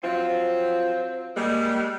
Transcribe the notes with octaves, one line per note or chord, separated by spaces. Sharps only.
F3 F#3 C4 F4
G3 G#3 A#3